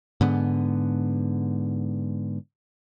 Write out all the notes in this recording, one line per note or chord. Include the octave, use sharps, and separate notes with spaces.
G#2 D3 B3